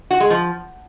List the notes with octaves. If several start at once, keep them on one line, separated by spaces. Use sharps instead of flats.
F#4
G#3
F3